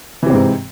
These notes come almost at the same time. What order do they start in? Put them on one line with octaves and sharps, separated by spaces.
E3 C3 C4 G#2